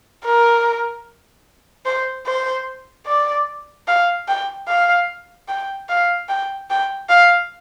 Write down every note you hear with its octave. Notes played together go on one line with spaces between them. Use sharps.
A#4
C5
C5
D5
F5
G5
F5
G5
F5
G5
G5
F5